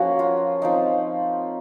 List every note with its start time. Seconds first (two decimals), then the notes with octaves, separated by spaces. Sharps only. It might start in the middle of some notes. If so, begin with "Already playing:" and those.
Already playing: F3 A#3 C#4 F#4
0.19 F4
0.62 F3 C4 D#4